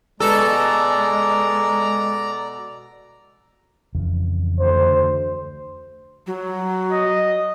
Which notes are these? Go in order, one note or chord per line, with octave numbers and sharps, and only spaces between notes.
B2 G#3 A4 D5 A#5 E6
F2 C#3 E3
D2 C5
F#3
D#5